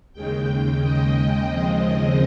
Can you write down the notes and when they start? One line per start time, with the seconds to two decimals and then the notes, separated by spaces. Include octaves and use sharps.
0.13 D#2 C#3 G#3 G5
0.81 D#5
1.48 D#2 C#3 F3 G#3 C4